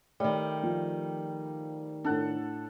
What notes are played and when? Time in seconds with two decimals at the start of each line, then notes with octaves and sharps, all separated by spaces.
0.20 D#3 G3 A3 C#5
0.63 F3
2.04 A2 D4 A4 F#5